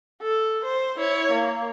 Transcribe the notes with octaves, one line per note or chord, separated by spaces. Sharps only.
A4
C5
E4 C#5
A#3